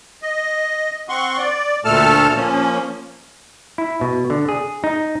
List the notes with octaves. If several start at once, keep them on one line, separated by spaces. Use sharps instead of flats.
D#5
C4 F#5 C6 C#6
D5
D2 A#2 A3 A4 A5 F6
F3 A#3 C#4
E4
B2
D3
G#4
D#4